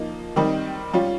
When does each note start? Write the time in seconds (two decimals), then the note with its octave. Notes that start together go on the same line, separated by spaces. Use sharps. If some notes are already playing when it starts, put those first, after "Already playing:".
Already playing: F3 A#3 D#4
0.36 D#3 G3 C4 D#4
0.94 G3 C#4 F4